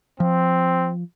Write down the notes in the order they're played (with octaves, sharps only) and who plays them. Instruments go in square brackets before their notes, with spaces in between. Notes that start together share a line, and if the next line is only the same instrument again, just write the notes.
[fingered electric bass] F3 [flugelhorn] C4